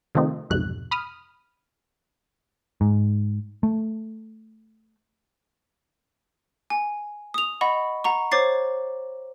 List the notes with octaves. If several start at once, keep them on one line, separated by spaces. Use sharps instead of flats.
C3 D#3 F3 A3 C4 D#4
B1 F2 G#2 C3 F#6
B5 D#6 F6
G#2
A3
G#5
D#6 F7
D#5 F#5 B5 C#6
F#5 A#5 C#6
C5 C#5 D6 A6 C7